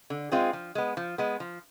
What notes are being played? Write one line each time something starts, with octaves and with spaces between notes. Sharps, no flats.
D3
G#3 C4 F4 G#4
F3
G#3 B3
F3
G#3 B3
F3